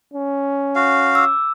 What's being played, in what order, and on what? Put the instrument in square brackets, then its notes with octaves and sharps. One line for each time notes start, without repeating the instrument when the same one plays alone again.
[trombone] C#4
[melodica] F#4 F5
[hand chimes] D6 E6